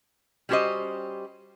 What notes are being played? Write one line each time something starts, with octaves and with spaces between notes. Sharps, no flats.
G3 C#4 F#4 G4 C5 D#5